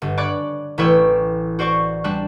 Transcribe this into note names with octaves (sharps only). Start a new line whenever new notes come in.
G1
C#5 D5 B5 D6 F#6
A1 E4 B4 C#5 G5 E6
F#4 C5 D5 C#6
G3 C4 D4 F#6